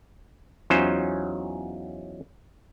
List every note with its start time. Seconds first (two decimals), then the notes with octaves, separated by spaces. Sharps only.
0.70 E2 F#3 C#4 D#4 F4 C5